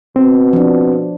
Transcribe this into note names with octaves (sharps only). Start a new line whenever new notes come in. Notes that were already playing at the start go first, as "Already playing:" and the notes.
B2 C4
F3 D4